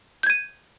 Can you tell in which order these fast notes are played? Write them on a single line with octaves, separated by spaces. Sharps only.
G6 G#6 D#7